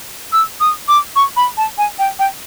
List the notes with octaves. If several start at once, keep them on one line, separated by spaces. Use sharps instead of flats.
E6
D#6
D6
C#6
B5
A5
G#5
G5
G5